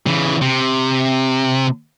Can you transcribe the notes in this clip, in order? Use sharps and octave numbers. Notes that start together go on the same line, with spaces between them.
C#3 E3
C3